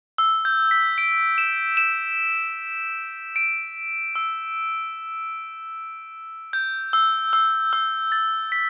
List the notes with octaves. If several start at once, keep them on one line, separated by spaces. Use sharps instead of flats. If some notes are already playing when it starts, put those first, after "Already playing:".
E6
G6
B6
D7
E7
E7
D7
E6
G6
E6
E6
E6
A6
B6